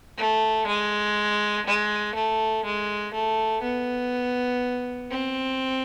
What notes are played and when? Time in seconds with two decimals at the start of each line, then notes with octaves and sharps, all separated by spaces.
0.18 A3
0.67 G#3
1.66 G#3
2.15 A3
2.65 G#3
3.14 A3
3.63 B3
5.11 C4